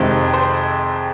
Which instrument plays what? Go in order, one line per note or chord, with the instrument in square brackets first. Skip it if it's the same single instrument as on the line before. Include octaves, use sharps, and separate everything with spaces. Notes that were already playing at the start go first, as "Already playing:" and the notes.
Already playing: [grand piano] F2 C3 D#3 G#3 C4 C5
C5